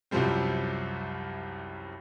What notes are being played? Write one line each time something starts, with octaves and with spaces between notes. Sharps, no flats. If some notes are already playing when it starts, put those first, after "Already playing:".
C2 F#2 C3 F3 G3 C4